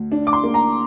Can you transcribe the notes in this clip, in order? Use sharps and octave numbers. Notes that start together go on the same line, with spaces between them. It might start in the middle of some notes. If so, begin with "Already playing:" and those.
Already playing: D2
D4
D6
C6
A#3
A#5